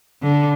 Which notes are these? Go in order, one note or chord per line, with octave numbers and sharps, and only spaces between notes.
D3